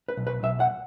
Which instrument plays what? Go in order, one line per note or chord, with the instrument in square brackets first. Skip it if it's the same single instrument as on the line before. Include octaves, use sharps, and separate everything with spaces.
[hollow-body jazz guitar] B4
B1
B4
B1 E5
F#5